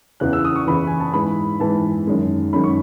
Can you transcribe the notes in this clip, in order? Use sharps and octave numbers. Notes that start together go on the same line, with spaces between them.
E2 C#3 E3 F#6
E6
D#6
C#6
E2 C#3 E3 B5
G#5
A5
G#2 E3 G#3 B5
G#2 E3 G#3 A5
F#2 D#3 G#3
F#2 D#3 G#3 B5
C#6